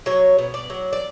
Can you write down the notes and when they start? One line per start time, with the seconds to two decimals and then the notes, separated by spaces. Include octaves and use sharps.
0.06 F#3 C#5
0.38 B2
0.54 D5
0.70 F#3
0.93 D5